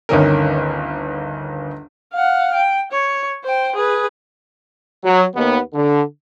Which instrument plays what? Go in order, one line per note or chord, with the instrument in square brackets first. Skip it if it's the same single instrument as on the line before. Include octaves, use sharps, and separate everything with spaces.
[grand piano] G1 D2 D#3 C#4 A#4
[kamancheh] F5 F#5
G5
C#5
C5 G5
G#4 B4
[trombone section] F#3
D#2 B3
D3